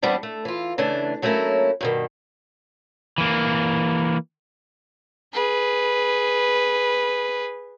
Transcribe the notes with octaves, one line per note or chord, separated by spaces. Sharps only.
E2 G2 G3 B3 C4 D4
A3
E3 F4
C#3 E3 A3 D4
F#3 A3 A#3 C#4 E4
G2 B2 D#3
E3 A#3
G#4 B4